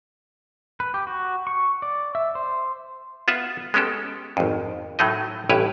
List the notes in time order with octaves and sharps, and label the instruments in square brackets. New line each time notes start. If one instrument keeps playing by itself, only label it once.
[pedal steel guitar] B4
G4
F#4
C#6
D5
E5
C5
[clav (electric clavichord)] B3 F4 E5 F#5
G#3 B3 C#4 G4 A4
G#1 F2
A2 F#3 A3 D#4 D#5
A1 G2 E4 G4 B4 C#5